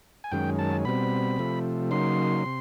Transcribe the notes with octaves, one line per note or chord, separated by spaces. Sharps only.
G#5
F#2 D#3 G#3 C#4 G5
A5
B2 G3 C4 B5
C3 F3 A3
C#3 F#3 A#3 D#4 C6
C3